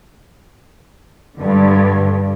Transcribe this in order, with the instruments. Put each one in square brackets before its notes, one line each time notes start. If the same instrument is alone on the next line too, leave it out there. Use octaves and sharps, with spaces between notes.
[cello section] G2 D3